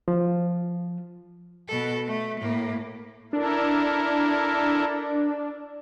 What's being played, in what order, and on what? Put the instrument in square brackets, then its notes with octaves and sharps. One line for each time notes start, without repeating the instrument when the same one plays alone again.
[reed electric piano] F3
[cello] B2 A4
A3
A2 A#3
[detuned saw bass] D4 [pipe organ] E4 A4 A#4